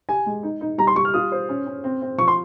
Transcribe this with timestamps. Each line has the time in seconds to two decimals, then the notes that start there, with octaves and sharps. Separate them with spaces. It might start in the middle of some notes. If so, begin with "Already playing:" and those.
0.09 G4 G#5
0.26 G#3
0.43 D#4
0.61 D#4
0.78 G3 A#5
0.87 C6
0.96 G3 C#6
1.05 F6
1.14 F4 D#6
1.32 C5
1.49 C#4
1.66 C#4
1.84 C4
2.02 C4
2.18 F3 C#6
2.28 C6